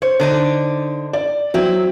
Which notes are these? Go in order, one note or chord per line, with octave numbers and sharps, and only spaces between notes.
C5 C#5
D3 D4 D#4
D5
F#3 C4 E4